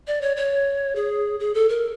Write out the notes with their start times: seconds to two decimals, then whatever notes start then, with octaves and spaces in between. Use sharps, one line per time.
0.07 D5
0.21 C#5
0.36 C#5
0.96 G#4
1.40 G#4
1.54 A4
1.69 A#4